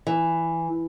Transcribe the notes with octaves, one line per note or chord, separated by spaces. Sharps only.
E3